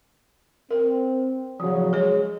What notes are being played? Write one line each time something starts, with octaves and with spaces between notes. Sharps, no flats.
C4 A#4
A2 C#3 F3 F#3
G#3 G#4 C#5